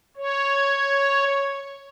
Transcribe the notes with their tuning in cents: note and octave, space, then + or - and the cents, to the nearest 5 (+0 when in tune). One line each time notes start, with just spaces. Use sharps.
C#5 +0